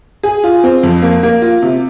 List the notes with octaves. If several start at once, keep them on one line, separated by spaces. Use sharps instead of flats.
G#4
F4
C4
F2
A#3
A#3
F4
C3